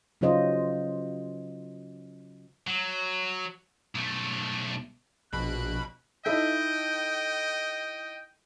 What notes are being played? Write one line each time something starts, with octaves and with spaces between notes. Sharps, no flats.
C#3 F#3 C#4 F4 C5 D#5
F#3
B1 A3
A#1 B2 B5 F#6
D#4 E4 A4 D#5 E5 G5